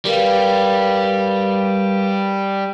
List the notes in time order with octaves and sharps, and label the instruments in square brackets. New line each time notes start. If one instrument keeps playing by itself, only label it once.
[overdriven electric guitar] G3 [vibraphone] A#4 B4 F5